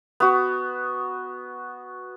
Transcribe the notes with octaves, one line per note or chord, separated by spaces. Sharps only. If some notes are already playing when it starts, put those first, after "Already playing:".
B3 F#4